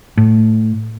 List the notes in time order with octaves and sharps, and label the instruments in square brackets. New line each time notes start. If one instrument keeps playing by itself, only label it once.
[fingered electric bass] A2